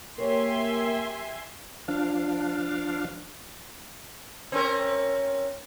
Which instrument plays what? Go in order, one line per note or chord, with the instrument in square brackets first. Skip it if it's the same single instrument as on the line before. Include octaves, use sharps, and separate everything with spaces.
[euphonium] A#3 [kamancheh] G4 G5 [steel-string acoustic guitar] A#4 C#5 [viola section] E5 G#5 C6
[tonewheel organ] F3 D4 F5
[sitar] C4 C#4 A#4